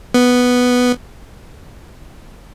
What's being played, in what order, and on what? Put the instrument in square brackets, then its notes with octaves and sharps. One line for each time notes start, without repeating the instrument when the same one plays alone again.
[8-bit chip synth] B3